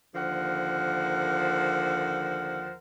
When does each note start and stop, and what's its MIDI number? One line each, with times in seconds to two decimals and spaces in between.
0.15 2.74 39
0.15 2.74 50
0.15 2.74 53
0.15 2.74 70
0.15 2.74 72
0.15 2.74 78